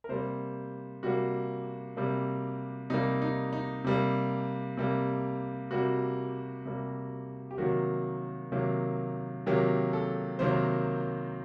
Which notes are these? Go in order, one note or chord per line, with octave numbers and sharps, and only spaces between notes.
A#4
C3 G3 A#3 C5
C3 G3 A#3 F#4
C3 G3 A#3
C3 G3 A#3 D#4
D#4
D#4
C3 G3 A#3
C3 G3 A#3
C3 G3 A#3 F#4
C3 G3 A#3
G4
C3 D#3 F#3 A#3 F#4
C3 D#3 F#3 A#3
C3 D#3 F#3 A#3 G4
A4
C3 D#3 F#3 A#3 C5